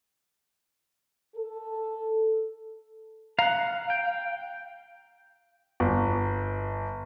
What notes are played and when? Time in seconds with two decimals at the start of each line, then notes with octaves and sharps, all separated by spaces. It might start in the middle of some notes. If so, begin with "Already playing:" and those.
1.36 A4
3.39 F5 F#5 A#5
3.90 G5
5.80 G1